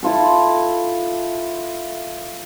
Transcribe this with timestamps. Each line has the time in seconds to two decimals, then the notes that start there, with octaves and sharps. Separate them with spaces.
0.03 E4 F4 A4